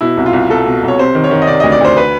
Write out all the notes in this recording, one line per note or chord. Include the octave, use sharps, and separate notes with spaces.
B2 E4
C2
F4
C2
C2 A4
B2
C2
C#5
C3 C5
D#3
C#5
D#3
D#5
C3 D5
D2 D#5
D5
D2 C5
B4